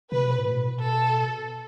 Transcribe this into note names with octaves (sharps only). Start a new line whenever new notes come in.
C3 B4
B2
A2
B2
A4